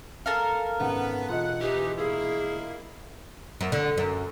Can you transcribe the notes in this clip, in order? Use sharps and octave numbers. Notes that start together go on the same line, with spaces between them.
A4 A#4 F5
G#1 F#2 B3 B4 F#5
E1 F4 D#5 F#5
E3 D#4 G4
A#3 E4 G#4
F#2
D3
F#2